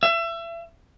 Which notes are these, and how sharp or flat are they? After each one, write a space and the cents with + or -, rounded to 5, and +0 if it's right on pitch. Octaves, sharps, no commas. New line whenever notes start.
E5 +30